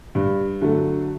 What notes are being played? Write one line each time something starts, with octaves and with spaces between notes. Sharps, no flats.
G2
D3 F#3 A3